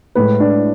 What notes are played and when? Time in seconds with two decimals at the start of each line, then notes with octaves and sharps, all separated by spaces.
0.15 A2 G#3 B4
0.40 D4